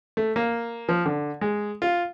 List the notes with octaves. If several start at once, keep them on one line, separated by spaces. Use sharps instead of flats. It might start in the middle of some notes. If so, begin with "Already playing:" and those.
A3
A#3
F3
D3
G#3
F4